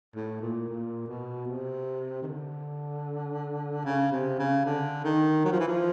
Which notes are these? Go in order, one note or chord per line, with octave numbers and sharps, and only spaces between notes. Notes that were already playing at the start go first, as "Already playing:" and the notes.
A2
A#2
A#2
B2
C3
D#3
D3
C#3
C3
C#3
D3
D#3
F#3
F3
E3
F3